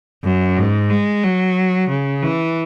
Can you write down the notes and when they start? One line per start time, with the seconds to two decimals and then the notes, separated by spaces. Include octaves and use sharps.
0.24 F#2
0.57 G#2
0.90 G#3
1.23 F#3
1.89 C#3
2.22 E3